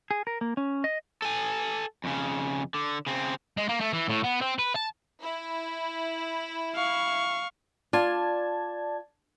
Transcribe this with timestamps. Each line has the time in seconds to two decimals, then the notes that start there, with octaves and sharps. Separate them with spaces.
0.11 G#4
0.27 A#4
0.41 A#3
0.57 C#4
0.84 D#5
1.22 A4 G#5
2.04 F2 C#3
2.74 D3
3.06 C#3 C4
3.57 G#3
3.69 A#3
3.81 A3
3.93 E3
4.09 A2
4.24 B3
4.41 C4
4.59 B4
4.76 A5
5.20 E4
6.75 F5 C#6
7.93 F4 D5 A5 G#6